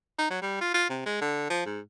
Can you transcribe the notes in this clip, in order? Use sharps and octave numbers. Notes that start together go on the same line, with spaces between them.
D#4
F#3
G3
F4
F4
C3
G#3
D3
F3
G#2